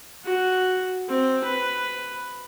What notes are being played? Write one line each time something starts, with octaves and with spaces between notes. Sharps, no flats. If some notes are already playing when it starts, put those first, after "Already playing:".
F#4
C4
B4